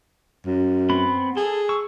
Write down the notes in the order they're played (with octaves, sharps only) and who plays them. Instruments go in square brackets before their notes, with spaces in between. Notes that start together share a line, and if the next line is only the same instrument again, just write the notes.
[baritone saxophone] F#2
[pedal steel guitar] B3 C4 B5
[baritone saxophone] G#4 [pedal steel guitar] A4
[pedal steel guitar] C#6 E6